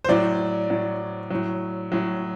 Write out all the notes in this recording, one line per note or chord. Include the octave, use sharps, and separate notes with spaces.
C5
A2 F#3 D5
A2 F#3
A2 F#3
A2 F#3